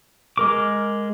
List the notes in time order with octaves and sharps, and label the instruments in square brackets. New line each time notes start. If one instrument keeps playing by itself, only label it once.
[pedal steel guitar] G#3 A#4 D6